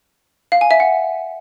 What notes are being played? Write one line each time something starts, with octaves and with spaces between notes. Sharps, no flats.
F5
G#5
E5
F#5